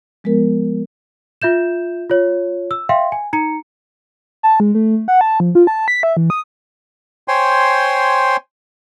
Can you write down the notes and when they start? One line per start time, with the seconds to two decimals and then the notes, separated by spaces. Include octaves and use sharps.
0.24 F3 G#3 B3 A#4
1.42 F4 E5 G6 E7
2.10 F4 C#5
2.71 E6
2.89 E5 F5 G5 C6
3.12 G#5
3.33 D#4 A#5 C#7
4.43 A5
4.60 G#3
4.75 A3
5.08 F#5
5.21 A5
5.40 F3
5.55 F4
5.67 A5
5.88 B6
6.03 E5
6.17 E3
6.30 D#6
7.28 C5 C#5 G5 G#5 C6